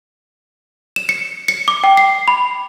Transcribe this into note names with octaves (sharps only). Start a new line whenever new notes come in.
E7
C#7
C#7
D6
G5
C7
B5